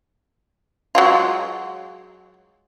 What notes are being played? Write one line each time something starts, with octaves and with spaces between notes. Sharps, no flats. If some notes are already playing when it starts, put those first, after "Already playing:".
F#3 G#3 F4